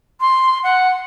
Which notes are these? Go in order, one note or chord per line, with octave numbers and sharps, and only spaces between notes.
C6
F#5